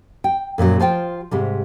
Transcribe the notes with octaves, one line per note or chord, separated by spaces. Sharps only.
G5
F#2 A#2 D#3 F#3
F3 F4 C5 G5
G#2 C3 G3